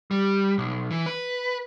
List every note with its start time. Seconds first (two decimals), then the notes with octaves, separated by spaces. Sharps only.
0.11 G3
0.58 B1
0.91 E3
1.06 B4